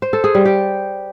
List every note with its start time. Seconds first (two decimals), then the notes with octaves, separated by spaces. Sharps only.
0.02 C5
0.13 A4
0.24 G#4
0.35 G3
0.45 G4